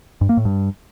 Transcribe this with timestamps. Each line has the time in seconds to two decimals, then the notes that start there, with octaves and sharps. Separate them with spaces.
0.21 G2
0.29 A#3
0.37 A2
0.45 G2